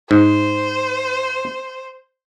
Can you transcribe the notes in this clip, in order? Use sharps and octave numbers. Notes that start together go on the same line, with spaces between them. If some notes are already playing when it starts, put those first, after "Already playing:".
G#2 C5